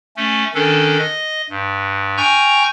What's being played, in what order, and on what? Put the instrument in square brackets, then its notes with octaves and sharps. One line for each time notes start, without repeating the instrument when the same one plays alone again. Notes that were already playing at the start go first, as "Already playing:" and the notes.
[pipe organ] A3 C#4
D#3 C#4 D4 A4
D#5
G2
G5 G#5 A#5 C#6 F6 G6